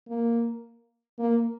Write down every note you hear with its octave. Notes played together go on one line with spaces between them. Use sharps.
A#3
A#3